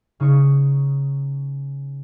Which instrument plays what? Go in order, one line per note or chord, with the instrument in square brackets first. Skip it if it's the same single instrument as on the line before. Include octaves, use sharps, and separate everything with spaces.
[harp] C#3 D#4 C#6 C#7